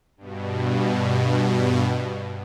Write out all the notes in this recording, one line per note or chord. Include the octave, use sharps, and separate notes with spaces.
G2 B2